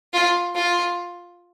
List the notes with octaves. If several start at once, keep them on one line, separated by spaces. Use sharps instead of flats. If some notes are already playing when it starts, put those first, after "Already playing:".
F4
F4